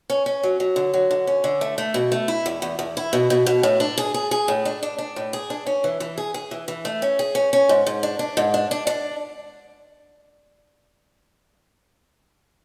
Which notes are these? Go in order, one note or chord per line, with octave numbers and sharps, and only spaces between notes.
C#4
C#4
F#3
F#3
D3
F#3
D3
C#4
D3
A3
A3
B2
A3
E4
E2
E2
E2
E4
B2
B2
B2
A2
D4
G#4
G#4
G#4
A2
D4
D4
D4
A2
G#4
D4
C#4
E3
E3
G#4
G#4
E3
E3
A3
C#4
G#4
C#4
C#4
G#2
G#2
D4
D4
G#2
D4
D4
D4